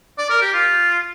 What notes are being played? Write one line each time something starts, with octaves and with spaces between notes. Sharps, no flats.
D5
A#4
G4
F4